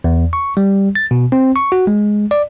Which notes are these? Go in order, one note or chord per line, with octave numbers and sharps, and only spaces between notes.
E2
C#6
G3
A6
B2
C4
C#6
F#4
G#3
D5